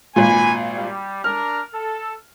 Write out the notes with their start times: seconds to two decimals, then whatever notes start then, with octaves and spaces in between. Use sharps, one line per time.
0.16 G#1 A#2 A#3 B4 G#5
0.75 G3
1.24 D4 A#4 F6
1.74 A4